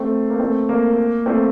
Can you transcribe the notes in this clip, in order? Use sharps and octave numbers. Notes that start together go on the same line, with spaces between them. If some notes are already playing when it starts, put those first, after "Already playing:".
Already playing: A3 C4
A#3
A3 C4
A#3
A3 C4